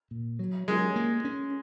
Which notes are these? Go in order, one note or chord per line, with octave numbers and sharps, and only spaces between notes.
A#2
F#3
F#3 G#3
A#3
C#4